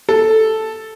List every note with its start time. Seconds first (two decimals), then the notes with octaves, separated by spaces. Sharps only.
0.09 A4